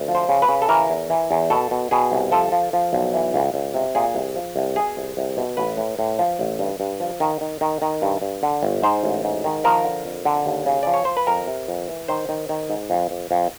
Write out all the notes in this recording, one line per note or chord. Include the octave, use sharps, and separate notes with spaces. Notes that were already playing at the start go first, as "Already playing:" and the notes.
Already playing: D2
F3
C5
C#3
B4
C#3
A4
E3 A#4
E2
E3
E2
B2 A4
B2
B2 G#4
C2
F3 A4
F3
F3
B1
E3
C#2
C#2
C3
A#2 G#4
C2
F3
C2
B2 G#4
C2
C2
B2
A1 B4
A2
A2
F3
A1
G2
G2
F3
D#3
D#3
D#3
D#3
G2
G2
D3
G1
G#2 C5
A1
G#2
D#3
F3 A#4
D3
F2
D3
D#2
C#3
F3 D5
C#5
F3 C5
B4
F2 A#4
C3
F2
E3
D#3 C5
D#3
D#3
G#2
F2
F2
F2